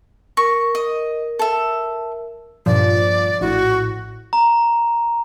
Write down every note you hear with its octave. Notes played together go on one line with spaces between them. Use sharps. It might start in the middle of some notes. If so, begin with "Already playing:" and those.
A#4 C#6
D#5
A4 E5
G2 A#2 F3 D5
A#1 A2 F#4
A#5